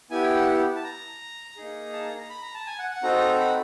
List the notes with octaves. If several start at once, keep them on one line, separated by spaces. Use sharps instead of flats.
B3 E4 G4 G#5
G5
F#5
A5
A#5
A#3 D#4 G#4
A5
A#5
A#5
B5
A#5
A5
G#5
F#5
F#5
C4 D#4 F#4 A4 A#5
B5